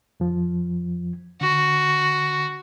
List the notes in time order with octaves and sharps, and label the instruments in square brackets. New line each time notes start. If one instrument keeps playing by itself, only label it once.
[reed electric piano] F2 F3
[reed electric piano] D3 [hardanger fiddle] F#4